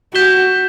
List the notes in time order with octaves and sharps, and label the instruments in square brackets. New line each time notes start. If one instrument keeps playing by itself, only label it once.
[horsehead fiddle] F#4 [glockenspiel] G6 B6 E7 G7